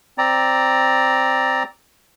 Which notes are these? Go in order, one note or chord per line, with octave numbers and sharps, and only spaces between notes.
C4 D5 A#5